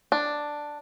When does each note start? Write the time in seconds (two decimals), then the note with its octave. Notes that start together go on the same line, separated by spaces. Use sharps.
0.12 D4